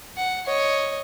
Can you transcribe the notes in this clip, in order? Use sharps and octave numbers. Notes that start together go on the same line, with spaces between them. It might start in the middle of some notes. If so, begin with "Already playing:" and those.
F#5
C#5 D#5